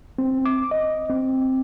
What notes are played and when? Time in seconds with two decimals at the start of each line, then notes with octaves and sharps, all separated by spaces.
0.18 C4
0.46 D6
0.71 D#5
1.10 C4